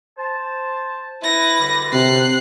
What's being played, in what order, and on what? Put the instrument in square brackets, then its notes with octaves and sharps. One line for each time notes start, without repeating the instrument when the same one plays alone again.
[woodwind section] C5 A5
[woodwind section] E4 [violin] B4 A#6
[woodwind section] F#2 D3 G3
[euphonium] C3 [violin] F#6 C7